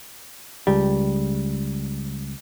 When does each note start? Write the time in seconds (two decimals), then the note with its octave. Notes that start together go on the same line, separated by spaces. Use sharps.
0.67 C#2 G3